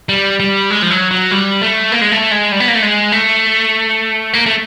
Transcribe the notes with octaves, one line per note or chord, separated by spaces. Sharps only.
G3
G3
G#3
F3
F#3
F#3
G3
A3
A#3
G#3
A3
G#3
G3
B3
A#3
A3
G#3
A3
A#3
A3